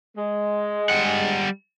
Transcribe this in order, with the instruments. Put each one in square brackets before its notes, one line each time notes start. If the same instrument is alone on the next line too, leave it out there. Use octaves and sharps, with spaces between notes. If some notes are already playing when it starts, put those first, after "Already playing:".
[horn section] G#3
[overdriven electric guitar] G3 F#5